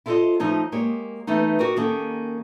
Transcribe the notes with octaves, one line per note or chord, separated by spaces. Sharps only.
E4 F4 A4 A#4 C5 D#5
F3 A3 D#4 C#5
G#3 A#3 G4 C#5
E3 A3 B3 D#4
F#4 G4 A#4 D#5
D#3 A#3 C#4 G4 A4